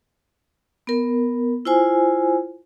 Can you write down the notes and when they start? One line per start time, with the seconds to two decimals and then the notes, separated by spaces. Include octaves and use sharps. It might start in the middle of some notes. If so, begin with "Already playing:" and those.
0.87 B3 A#4
1.65 E4 F4 C5 G#5